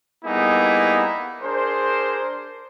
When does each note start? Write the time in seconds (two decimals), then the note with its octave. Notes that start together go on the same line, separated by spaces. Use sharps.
0.24 G3 A#3 B3 D#4 E4 G#4
1.43 D4 G#4 A#4 C5